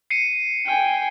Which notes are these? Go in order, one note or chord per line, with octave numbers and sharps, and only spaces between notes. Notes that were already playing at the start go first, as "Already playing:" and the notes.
C7 C#7 D#7
G5 G#5